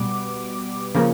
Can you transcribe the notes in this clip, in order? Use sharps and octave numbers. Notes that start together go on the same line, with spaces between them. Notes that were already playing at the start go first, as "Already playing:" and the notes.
Already playing: B2 G3 B3 D6
C#3 F3 A#3 C#4